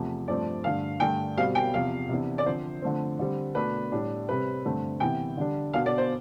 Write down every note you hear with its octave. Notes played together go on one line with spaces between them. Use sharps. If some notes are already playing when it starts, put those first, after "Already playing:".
Already playing: E2 C3 F3 A3
G2 F3 A3 C4 D5
G2 D3 A3 F5
G2 D3 A3 D4 G5
B2 G3 C4 F5
G5
E2 C3 F3 F5
C3 E3 B3 D4
D5
D3 F3 C4 C5
D3 F3 A3 C4
D3 G3 C4
B2 A3 D4 B4
A2 G3 D4
C3 G3 C4 B4
G2 D3 A3 C4
C3 E3 B3 G5
D3 G3 D4
B2 B3 D4 F5
D5
C5